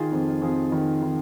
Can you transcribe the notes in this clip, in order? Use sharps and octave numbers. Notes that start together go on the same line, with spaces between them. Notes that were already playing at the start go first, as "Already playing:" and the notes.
Already playing: D#3 F4 G#4
F2
F2 F4 G#4
D#3
D#3